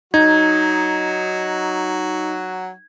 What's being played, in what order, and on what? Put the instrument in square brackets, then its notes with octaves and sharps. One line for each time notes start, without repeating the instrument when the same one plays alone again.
[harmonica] F#3 F#4 [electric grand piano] D#4 [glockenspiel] G#6